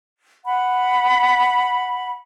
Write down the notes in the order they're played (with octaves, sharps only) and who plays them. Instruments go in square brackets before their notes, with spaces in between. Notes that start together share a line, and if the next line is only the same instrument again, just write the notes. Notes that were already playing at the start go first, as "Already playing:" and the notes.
[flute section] F#5 B5